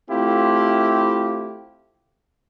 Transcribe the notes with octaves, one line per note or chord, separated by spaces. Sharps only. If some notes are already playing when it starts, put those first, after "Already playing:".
A3 C4 E4 F4 G4